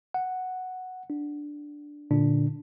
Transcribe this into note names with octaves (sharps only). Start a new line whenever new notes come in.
F#5
D4
A#2 D3 D4